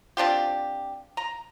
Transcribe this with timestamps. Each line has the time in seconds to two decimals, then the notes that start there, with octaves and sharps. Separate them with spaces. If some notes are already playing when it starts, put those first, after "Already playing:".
0.17 C4 D4 F4 G4
1.17 A#5